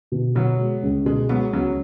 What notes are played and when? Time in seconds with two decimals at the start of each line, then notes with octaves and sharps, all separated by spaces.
0.12 B2
0.35 B2 F#3 B3
0.59 G#3
0.83 C#2
1.05 B2 G#3
1.29 F#3 G#3 B3
1.53 C#2 F#3 B3